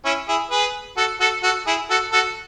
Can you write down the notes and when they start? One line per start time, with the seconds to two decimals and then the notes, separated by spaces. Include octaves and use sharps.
0.05 C#4 E4
0.28 E4 G#4
0.51 G#4 B4
0.97 F#4 A4
1.20 F#4 A4
1.43 F#4 A4
1.67 E4 G#4
1.90 F#4 A4
2.12 F#4 A4